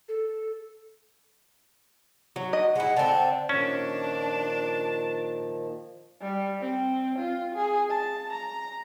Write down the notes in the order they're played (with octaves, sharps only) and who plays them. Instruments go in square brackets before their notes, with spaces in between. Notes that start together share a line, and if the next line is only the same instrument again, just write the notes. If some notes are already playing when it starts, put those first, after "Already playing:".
[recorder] A4
[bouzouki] F#3
[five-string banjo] D#5
[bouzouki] G#3 E4 [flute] F#5
[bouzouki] D3 C4 [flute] A5
[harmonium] A#2 D#3 F3 [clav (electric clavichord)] C#4 [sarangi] D4 [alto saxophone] A5
[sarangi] G3
C4
F4
G#4
A5
A#5